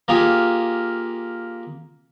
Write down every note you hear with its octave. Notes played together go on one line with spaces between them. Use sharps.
A#3 F4 G4 G#4